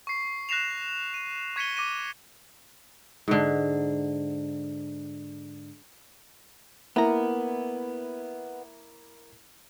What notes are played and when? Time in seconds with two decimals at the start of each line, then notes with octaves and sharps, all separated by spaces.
0.07 C#6 C7
0.49 F#6 A#6 C7 E7 F7
1.14 D#7
1.56 C#6 G#6 B6 C#7 D#7 G7
1.77 D6 A#6 D#7
3.28 G#2 D3
6.96 A#3 B3 E4 A#5